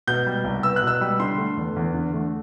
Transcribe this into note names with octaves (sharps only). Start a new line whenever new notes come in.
B2 G6
G3
C2
B3 E6
F#6
B2
E6
G3
D3 C6
A3
E2
E2
D3
A3